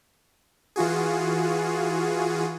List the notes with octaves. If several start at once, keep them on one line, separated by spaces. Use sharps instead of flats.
E3 F4 F#4 G#4